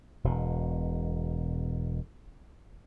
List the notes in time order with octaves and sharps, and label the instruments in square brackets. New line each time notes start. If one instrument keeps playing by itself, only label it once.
[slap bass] E1 B2